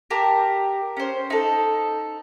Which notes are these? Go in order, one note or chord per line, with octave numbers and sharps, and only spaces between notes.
G4 A#4 A5 A#5
C#4 C5
D#4 A4